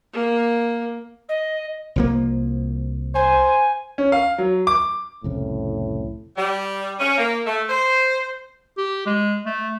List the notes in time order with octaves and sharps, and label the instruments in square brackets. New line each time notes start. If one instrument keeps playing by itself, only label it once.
[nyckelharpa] A#3
[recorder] D#5
[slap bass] C2 F3 A#3
[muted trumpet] C5 [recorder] G#5
[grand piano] C#4
F5
F#3
D6
[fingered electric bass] C2 F2 C#3 [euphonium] A2
[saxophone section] G3
C#4
A#3
A3
C5
[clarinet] G4
G#3
A3